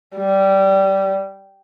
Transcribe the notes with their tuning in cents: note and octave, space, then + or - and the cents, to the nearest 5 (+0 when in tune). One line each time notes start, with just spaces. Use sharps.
G3 -15